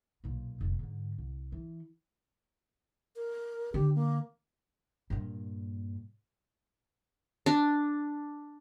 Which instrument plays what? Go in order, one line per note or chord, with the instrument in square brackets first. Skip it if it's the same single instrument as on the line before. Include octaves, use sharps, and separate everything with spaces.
[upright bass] B1 A#2
F1 A#2
G#2 D3
C2
E3
[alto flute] A#4
[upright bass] D3 [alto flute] G4
[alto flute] A#3
[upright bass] G2 A#2
[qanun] D4